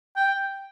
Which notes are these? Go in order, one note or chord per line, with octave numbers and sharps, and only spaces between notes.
G5